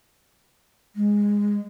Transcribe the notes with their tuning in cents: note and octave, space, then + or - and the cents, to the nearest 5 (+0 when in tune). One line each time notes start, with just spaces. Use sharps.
G#3 -15